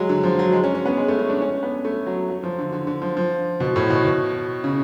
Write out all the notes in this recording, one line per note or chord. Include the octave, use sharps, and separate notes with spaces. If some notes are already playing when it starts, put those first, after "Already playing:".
Already playing: F#3 G#3
D3
F3
F#3
G#3
C#4
C#4
B3
G#3
A3
C#4
D4
C#4
B3
A3
F#3
F#3
F3
D3
D3
D3
F3
F3
B2
A2
B2
B2
C#3